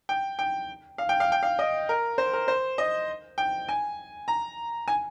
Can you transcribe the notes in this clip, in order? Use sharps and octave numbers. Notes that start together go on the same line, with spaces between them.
G5
G5
F5
G5
F5
G5
F5
D#5
A#4
C5
A#4
C5
D#5
G5
G#5
A#5
G#5